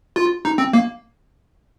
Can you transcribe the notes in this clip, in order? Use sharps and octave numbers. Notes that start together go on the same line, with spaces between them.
F4
D#4
C4
A#3